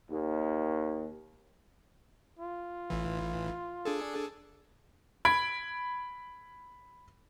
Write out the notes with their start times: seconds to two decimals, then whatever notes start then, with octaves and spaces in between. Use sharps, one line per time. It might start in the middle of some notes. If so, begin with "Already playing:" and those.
0.10 D#2
2.39 F4
2.90 A1 E3
3.85 D4 G#4 A4
5.25 B5 G#6 D7